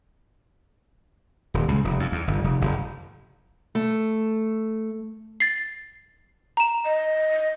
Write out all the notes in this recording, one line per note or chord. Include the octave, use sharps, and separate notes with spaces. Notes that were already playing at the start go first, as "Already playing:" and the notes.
D#1
C#2
F1
F2
E2
G1
F1
F#1
A3
A6 C7
A#5 E7
D#5